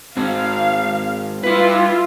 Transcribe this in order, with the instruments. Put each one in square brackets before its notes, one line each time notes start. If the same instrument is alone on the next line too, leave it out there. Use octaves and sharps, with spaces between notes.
[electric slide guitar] G#2 C4 [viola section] F5
[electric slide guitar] G3 B4 [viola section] E4 F4